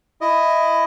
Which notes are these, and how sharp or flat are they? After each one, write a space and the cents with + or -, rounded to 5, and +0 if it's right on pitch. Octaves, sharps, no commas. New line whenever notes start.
E4 +10 D#5 +0